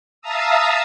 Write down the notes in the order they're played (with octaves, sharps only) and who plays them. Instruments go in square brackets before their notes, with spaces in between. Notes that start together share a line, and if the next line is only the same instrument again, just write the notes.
[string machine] E5 F5 A5 A#5 D#6 E6